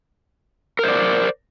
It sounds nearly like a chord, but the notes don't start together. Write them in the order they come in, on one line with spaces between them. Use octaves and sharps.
A#4 C5 D5